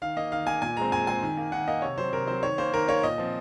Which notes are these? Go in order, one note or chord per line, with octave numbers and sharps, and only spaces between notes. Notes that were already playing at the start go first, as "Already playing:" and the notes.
D#3 F5
A#3 D#5
D#3 F5
A#3 G#5
A#2 G#5
G#3 C4 A#5
A#2 G#5
G#3 C4 G#5
D#3
A#3
D#3 F#5
A#3 D#5
C3 C#5
F#3 C4 C5
C3 A#4
F#3 C4 C5
D#3 C#5
A#3 C5
D#3 A#4
A#3 C#5
A#2 D#5
F3 C4